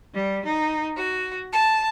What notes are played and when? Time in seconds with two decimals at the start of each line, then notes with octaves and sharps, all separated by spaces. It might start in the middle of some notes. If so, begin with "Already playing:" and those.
0.13 G3
0.45 D#4
0.97 F#4
1.52 A5